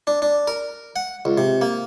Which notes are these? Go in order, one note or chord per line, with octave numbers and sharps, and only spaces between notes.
D4
D4
A#4
F#5
C#2
C3
A#3